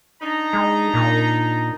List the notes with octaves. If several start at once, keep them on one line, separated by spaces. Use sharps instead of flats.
D4 D#4 A#5
G#3
A#2